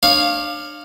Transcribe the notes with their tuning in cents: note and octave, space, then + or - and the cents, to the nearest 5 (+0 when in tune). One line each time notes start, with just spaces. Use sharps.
D4 +30 C#5 -10 F5 +0